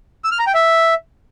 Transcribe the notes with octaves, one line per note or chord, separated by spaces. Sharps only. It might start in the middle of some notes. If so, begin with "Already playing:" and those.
E6
F6
A#5
G5
E5